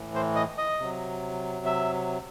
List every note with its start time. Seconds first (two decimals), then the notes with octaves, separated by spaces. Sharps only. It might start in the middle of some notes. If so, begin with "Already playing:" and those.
Already playing: A2 E3
0.15 C5
0.36 D#5
0.58 D#5
0.80 C3 F#3
1.66 E5